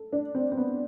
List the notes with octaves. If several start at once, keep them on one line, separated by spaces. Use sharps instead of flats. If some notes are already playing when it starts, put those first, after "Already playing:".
Already playing: A4
D4
C4
C4
B3